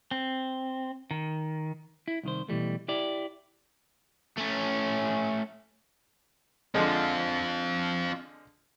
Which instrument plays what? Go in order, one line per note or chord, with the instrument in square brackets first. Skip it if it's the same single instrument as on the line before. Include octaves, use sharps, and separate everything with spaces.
[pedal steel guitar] C4
D#3
[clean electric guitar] E4
C2 D#3 C5
B2 E3 G3 A3
E4 G4 D5
[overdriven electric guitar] A3 C#4
[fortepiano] D3 F3 G#3 [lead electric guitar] C4 F4